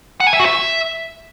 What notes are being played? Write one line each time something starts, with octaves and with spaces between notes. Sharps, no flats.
F#5
G#5
E5
F#4
E5